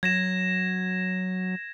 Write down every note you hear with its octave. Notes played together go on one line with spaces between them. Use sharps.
F#3 G#6 A#6 E7